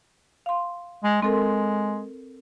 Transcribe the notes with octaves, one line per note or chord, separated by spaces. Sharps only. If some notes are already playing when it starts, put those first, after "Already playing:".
F5 C6
G#3
G#3 C4 A4 A#4